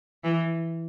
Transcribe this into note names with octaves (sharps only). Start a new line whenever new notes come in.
E3